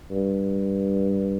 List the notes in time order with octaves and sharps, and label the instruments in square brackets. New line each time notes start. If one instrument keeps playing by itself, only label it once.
[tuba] G2